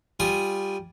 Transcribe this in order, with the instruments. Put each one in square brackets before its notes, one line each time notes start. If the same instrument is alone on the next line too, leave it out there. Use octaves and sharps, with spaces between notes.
[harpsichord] G3 F4 G#5 D#6